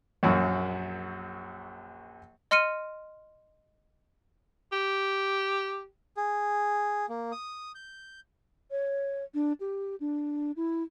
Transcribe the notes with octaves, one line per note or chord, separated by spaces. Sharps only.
A#1 F#2 F#3
D#5 C6 F6 C#7 D#7
G4
G#4
A#3
D#6
G6
C#5
D4
G4
D4
E4